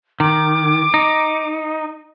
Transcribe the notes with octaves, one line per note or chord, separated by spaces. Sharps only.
D#3 D6
D#4